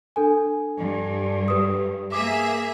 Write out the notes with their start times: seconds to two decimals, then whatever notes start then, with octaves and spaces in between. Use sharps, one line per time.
0.16 D4 A4 G#5
0.80 G2
1.48 G4 B4 D#6
2.12 A#3 G#4 E5 D6